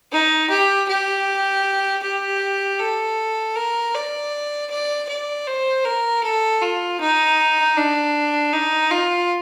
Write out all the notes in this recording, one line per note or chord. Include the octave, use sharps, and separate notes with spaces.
D#4
G4
G4
G4
A4
A#4
D5
D5
D5
C5
A#4
A4
F4
D#4
D4
D#4
F4